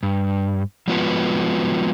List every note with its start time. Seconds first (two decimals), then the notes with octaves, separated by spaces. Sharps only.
0.03 G2
0.88 F3 G#3 B3 F4 F#4 B4